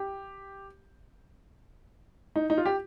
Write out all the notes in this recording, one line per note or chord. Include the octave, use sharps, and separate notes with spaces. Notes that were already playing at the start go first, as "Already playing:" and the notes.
Already playing: G4
D#4
D#4
F4
G4